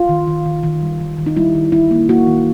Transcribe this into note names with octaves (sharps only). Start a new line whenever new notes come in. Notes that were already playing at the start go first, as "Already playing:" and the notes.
Already playing: F4
D#3
D#3
D#3
D#3
G3
D#3
D#3
D#4
G3 E4
D#3
G3 E4
A#3
A#3 F#4
D#3